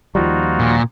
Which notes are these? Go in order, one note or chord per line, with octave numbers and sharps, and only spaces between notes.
D#2 F3 G3 D#4 F4 F#4
A#2